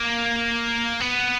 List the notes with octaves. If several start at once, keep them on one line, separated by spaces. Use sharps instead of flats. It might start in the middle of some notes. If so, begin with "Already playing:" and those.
Already playing: A#3
B3